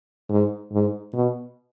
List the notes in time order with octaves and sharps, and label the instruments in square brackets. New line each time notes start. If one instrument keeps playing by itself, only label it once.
[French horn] G#2
G#2
B2